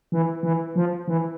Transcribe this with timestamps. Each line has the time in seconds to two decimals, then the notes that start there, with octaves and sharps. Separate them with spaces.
0.12 E3
0.43 E3
0.76 F3
1.08 E3